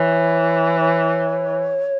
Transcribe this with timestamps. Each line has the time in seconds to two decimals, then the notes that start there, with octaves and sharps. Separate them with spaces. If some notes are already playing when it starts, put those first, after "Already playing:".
Already playing: E3 C#5
0.80 C#5